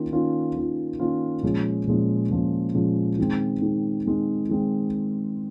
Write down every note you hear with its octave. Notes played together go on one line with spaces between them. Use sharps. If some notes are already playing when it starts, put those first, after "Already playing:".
Already playing: D#3 A#3 C#4 F4
D#3 A#3 C#4 F4
D#3 A#3 C#4 F4
D#3 A#3 C#4 F4
A#2 F3 G#3 C#4
A#2 F3 G#3 C#4
A#2 F3 G#3 C#4
A#2 F3 G#3 C#4
D#3 G#3 C4
D#3 G#3 C4
D#3 G#3 C4
D#3 G#3 C4